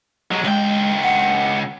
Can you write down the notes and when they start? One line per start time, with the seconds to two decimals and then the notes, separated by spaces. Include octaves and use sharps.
0.31 F#3 G#3
0.44 C#2 G#3 G5
1.03 F#5